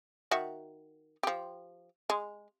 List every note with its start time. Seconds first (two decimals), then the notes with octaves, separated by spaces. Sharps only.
0.31 D#3 F#4 E5
1.23 F3 G4
2.10 G#3